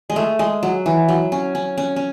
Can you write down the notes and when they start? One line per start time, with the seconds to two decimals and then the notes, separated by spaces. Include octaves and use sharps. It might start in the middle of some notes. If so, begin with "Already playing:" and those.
0.10 G#3
0.16 A3
0.39 G#3
0.63 F#3
0.86 E3
1.08 F#3
1.32 C#4
1.55 C#4
1.78 C#4
1.96 C#4